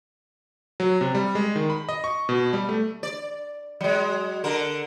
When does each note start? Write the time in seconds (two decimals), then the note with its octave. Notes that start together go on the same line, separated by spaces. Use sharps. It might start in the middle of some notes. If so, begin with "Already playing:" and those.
0.80 F#3
1.01 C3
1.15 G3
1.35 G#3
1.56 D#3
1.70 B5
1.89 D#5
2.04 C#6
2.29 B2
2.53 G3
2.69 A3
3.03 D5
3.81 F#3 G#3
4.44 D3 A#4